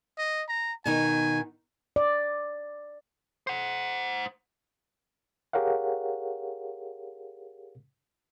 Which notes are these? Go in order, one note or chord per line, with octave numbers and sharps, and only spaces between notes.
D#5
A#5
B2 D#3 D#4 G#5
D5
C5 F#5
G4 G#4 A#4 C#5 F5 F#5